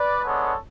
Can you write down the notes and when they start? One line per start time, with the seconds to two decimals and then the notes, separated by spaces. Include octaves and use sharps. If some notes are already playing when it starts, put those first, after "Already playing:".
Already playing: B4 D5
0.24 G#3 B3 D4 A4 C#5